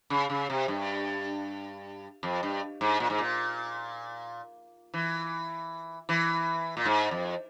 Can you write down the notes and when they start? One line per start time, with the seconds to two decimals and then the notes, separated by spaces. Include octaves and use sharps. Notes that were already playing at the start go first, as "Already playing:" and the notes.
0.10 C#3
0.30 C#3
0.50 C3
0.68 G2
2.23 F2
2.43 G2
2.81 G#2
3.00 A#2
3.10 G#2
3.18 A#2
4.94 E3
6.09 E3
6.77 A#2
6.85 G#2
7.11 F2